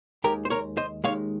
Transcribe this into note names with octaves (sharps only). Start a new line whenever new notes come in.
D#2 D#3 G#3 G4 A#4
C5
A#4 C#5
C5 D#5
D#2 D#3 G#3 C#5 F5